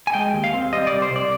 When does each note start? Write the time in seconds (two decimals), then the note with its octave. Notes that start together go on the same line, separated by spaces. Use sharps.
0.07 G#5
0.14 G#3 G5
0.33 D#2
0.44 F5
0.54 C4
0.73 G3 D#5
0.87 D5
0.93 C2
1.02 C5
1.12 C2 D5